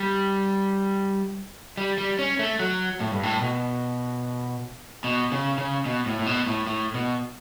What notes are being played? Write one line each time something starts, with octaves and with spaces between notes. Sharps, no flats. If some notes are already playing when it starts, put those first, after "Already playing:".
Already playing: G3
G3
G3
C#4
A3
F#3
A2
G2
A2
B2
B2
C#3
C#3
B2
A2
A2
B2
A2
A2
B2